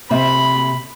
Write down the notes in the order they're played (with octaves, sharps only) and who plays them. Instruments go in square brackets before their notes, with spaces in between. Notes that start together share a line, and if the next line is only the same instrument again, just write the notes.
[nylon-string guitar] C3 E5 [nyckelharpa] B5